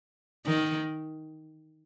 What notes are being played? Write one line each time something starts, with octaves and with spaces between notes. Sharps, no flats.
D#3